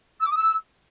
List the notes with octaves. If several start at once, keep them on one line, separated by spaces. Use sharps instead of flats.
E6
D6
D#6
E6